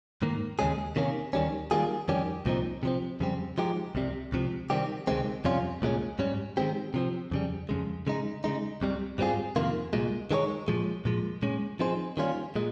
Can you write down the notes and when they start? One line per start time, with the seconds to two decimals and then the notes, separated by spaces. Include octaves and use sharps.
0.22 G#2 D#3 A#3
0.59 D#2 C#3 G#3 C#4 G#4
0.96 C3 D#3 A#3 C#4
1.33 D#2 D#3 G3 C#4
1.71 D#3 G3 A#3 F4 G#4
2.08 F2 D#3 G3 C#4 G4
2.46 C2 A#2 F3 C4 D#4
2.83 C3 F3 C4
3.20 F2 C#3 G3 C4
3.58 F3 G#3 D#4 G4
3.95 C2 C3 G3
4.32 C#2 C3 F3
4.70 C3 D#3 G3 C4 G4
5.07 C#2 C3 D#3 G#3 C4
5.45 F2 C3 G3 C#4 F4
5.82 C2 A#2 G#3 C#4
6.19 G#2 G3 C#4
6.57 D#3 G#3 C4 G4
6.94 C3 F3 C4
7.31 F2 C#3 G3
7.69 F2 C#3 G#3
8.07 C#3 G#3 D#4
8.44 C#3 G#3 D#4
8.81 C2 C3 G3
9.18 G#2 G3 C4 F4 G#4
9.56 F2 C3 D#3 A#3 F4
9.93 C2 A#2 G#3
10.31 D#3 G#3 D#4 G#4 C#5
10.68 A#2 F3 G#3
11.05 A#2 F3 G#3
11.42 A#2 G#3 C#4
11.79 F3 C4 D#4 G#4 C5
12.17 D#3 G3 A#3 C#4 F4
12.56 A#2 G#3